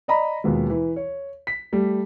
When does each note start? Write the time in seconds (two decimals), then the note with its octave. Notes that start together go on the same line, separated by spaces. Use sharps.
0.08 D5 D#5 A#5 B5
0.44 D#2 B2 F3 G#3
0.70 E3
0.96 C#5
1.47 B6
1.73 G3 A3